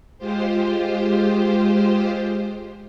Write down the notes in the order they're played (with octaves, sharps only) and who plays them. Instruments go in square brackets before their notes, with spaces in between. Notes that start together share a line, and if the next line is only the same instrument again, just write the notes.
[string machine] G#3 F4 G4 C5